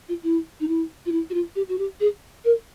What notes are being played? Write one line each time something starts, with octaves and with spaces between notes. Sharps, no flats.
F4
E4
D#4
E4
F4
E4
F#4
F4
G4
F#4
G4
G#4
A#4